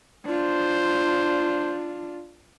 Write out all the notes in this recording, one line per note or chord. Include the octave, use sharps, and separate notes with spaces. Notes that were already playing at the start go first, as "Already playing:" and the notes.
D4 F4 C5